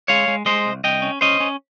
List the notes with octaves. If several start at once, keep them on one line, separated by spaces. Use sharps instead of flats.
G#3 C#5 F5
G#3
G#3 C5 D#5
C2
C2 D#5 G5
C#4
C#4 C5 D#5
C#4